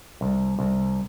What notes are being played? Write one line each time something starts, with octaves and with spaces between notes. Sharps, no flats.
C2
C2